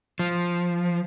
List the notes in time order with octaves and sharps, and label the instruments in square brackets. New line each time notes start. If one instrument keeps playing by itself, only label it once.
[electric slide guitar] F3